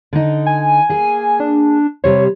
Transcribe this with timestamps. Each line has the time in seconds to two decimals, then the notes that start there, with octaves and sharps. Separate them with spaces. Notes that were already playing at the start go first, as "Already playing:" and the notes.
0.13 D3 D#4
0.46 G#5
0.89 A#3 G#4
1.40 D4
2.04 C3 G3 C5 C#5